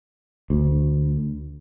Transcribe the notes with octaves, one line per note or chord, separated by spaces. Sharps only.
D2